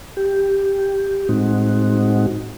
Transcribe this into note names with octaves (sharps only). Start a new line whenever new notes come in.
G4
A2 G#3 C4 D#4 F#4